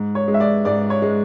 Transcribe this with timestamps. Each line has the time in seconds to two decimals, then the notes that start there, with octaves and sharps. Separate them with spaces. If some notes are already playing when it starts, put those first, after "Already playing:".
Already playing: G#2
0.15 C#5
0.28 G#3
0.34 E5
0.40 D5
0.65 G#2 D5
0.90 C#5
1.02 G#3